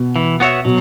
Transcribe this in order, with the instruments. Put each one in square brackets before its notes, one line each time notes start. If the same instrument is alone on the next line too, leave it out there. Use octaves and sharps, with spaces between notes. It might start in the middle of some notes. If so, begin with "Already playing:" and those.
Already playing: [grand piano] B2
[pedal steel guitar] E3
B3 F#4 C#5 E5
[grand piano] B2 [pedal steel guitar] F#3